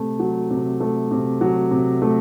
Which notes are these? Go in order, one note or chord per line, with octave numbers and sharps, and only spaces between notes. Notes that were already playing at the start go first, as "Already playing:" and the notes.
Already playing: C3 A3
F#3
C3
A3
C3
F#3
C3
A3